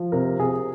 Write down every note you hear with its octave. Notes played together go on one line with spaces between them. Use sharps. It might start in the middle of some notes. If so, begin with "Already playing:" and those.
Already playing: F3
C3 A#4
C3 G#4